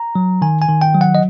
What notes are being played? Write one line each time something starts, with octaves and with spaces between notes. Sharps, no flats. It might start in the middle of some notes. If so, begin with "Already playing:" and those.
Already playing: A#5
F#3
D#3 G#5
G#5
D#3
G5
F#3
F#5
D#5